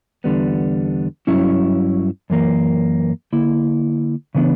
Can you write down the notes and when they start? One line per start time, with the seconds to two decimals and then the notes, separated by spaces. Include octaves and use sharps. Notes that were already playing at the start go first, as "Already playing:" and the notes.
0.24 E2 D3 G3 B3
1.27 G2 F#3 C#4 E4
2.30 F#2 E3 A#3
3.33 D3 A#3 E4
4.35 C#3 E3 B3 D4